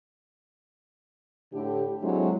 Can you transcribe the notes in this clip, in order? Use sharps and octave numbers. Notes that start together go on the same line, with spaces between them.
A2 D3 G4
D3 F#3 G#3 C4 E4